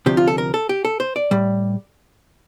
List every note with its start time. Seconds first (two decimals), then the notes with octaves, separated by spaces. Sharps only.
0.06 D2 C3 F3 G4
0.17 F4
0.28 A4
0.38 A#4
0.54 A4
0.69 G4
0.85 A4
1.00 C5
1.16 D5
1.31 A2 G3